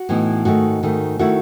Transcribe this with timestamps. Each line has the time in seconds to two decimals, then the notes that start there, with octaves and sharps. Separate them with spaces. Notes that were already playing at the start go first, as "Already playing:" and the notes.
Already playing: F#4
0.09 A2 E3 B3 D#4
0.45 G#2 D#3 A3 F#4
0.83 G#2 D#3 A3
1.19 D#3 A3 E4 F#4